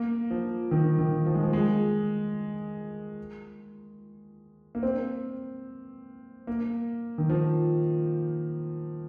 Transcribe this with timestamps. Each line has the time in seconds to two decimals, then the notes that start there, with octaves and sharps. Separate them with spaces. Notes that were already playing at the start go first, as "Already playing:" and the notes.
Already playing: A#3
0.31 F3
0.71 D#3
0.99 D#3
1.26 F3
1.35 G#3
1.43 F3
1.53 G#3
4.75 A#3
4.83 C4
6.47 A#3
7.18 D#3
7.30 F3